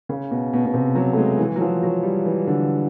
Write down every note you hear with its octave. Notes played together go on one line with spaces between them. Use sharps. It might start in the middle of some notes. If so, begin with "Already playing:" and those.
C#3
B2
B2
B2
C3
F#3
A3
G#3
E3
F#3
F3
F#3
G3
E3
D3